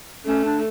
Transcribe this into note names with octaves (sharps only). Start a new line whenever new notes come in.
A3 C#4
D4